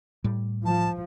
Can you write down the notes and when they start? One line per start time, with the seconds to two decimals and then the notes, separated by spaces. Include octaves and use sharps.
0.24 A2 G3
0.65 F3 A5